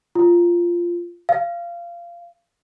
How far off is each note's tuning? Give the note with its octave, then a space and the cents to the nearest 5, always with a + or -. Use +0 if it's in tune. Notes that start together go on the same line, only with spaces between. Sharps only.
F4 -10
F5 -20